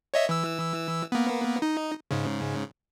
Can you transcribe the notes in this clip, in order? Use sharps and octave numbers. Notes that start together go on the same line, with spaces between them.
C#5 D#5 E5
E3 E6
A#3 B3
D#4
G#2 C#3